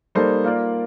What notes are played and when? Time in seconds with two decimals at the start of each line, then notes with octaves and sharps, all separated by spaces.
0.15 G3 A#3 D#4 A4 C5
0.44 A#3 F4 A#4 D5